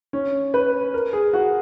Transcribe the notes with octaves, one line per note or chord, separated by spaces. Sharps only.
C#4
B4
A#4
G#4
F#4